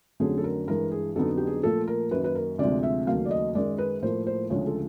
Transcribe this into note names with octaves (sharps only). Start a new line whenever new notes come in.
F2 D3 F#3 A3 C#4 G#4
A4
A#4
G2 E3 G#3 A#4
G#4
F2 D3 F#3 B3 D#4 A4
G4
G#4
A#2 F3 A3 A4
A#4
F#2 D#3 F#3 A#3 B4
B4
A#4
D2 C3 F3 G#3 D5
E5
D#2 C#3 F#3 A3 F5
D5
D#5
F#2 D#3 G#3 D5
B4
A2 F3 A#3 C5
C5
D2 C#3 F3 G#3 C#5
A4